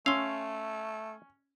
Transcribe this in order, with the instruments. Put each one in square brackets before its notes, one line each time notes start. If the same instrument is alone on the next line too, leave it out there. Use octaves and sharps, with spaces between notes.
[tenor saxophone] A3 [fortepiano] C#4 [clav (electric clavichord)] F5 [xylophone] C6 E6